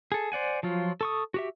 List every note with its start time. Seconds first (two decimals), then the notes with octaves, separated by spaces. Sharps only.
0.12 G#4 A4
0.32 C5 D5 F#5 G#5
0.63 F3 F#3 F4
1.01 A4 C#6 D#6
1.34 F#4 G4 E5